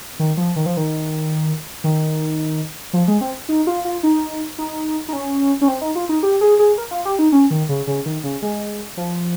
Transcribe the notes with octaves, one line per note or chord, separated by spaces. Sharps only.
D#3
F3
D#3
F3
D#3
D#3
F3
G#3
C4
D#4
F4
F4
D#4
D#4
D#4
C#4
C#4
C4
D#4
F4
D#4
G4
G#4
G#4
A#4
F4
G4
D#4
C#4
D#3
C#3
C#3
D#3
C#3
G#3
F3